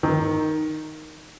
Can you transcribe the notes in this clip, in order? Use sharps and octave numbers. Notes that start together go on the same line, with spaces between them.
D#3